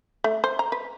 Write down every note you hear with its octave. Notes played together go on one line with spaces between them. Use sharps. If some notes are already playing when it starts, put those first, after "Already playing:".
A3
C5
A#5
B4